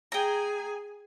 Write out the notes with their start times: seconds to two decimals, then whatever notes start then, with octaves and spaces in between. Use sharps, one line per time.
0.12 G#4 G5 G#5 A#5